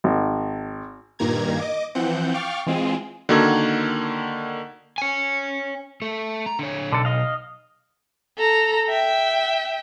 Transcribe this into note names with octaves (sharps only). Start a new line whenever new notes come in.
G#1
G2 A#2 D#3 A#3 A#5 G#6
D#5 D6
E3 F3 C4 F#5 G6
F5 G5 C#6 D6 F6 A6
E3 G#3 C4 F4 G#4
D3 D#3 A#3 F#4 E6 G#6
C#5 G#5
A3 A4
A#5
D3 C#5
B1 D3 A4
D#5 F5
A4 A#5
E5 G5